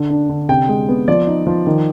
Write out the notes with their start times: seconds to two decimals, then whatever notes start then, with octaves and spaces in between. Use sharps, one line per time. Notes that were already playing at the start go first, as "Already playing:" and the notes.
Already playing: D3
0.10 D4
0.29 D3
0.49 C3 G5
0.69 G#3
0.89 B3
1.08 F3 D5
1.27 D#4
1.47 F3
1.67 D#3